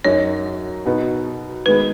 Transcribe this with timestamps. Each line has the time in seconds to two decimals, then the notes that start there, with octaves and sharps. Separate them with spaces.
0.04 F#2 F#3 D#4 F#4 C#5
0.85 B2 B3 D#4 F#4
1.66 D#3 G#3 B3 B4